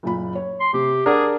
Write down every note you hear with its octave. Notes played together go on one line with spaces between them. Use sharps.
F#1 A#2 B5
C#5
C6
C3 G4
D4 G#4 A#4 F#5